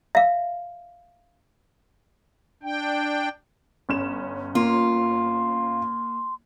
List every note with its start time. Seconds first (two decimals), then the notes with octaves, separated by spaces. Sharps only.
0.15 E5 F5
2.63 D4 G5
3.89 G1 C#4 E7
4.55 A#3 F4 C6